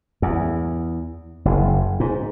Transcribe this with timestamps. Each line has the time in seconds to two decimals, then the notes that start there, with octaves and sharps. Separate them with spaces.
0.22 E2
1.45 F#1
2.00 G#2